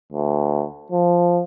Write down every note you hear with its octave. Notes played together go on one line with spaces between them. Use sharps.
D2
F3